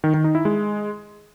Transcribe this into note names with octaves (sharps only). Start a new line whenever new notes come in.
D#3
D#3
D#4
E4
G#3